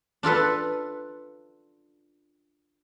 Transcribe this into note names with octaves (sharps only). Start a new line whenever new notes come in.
D4 F4 A4 B4